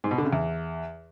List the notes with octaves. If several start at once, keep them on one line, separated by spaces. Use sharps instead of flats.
G#2
B2
D3
C#3
E2